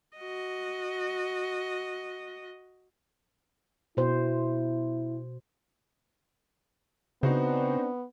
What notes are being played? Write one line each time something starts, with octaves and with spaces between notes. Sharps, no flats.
F#4 D#5
B2 E4 C5
C#3 B3 C4 D4 D#4 F#4 C5